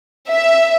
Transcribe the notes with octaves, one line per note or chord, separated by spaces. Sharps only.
E5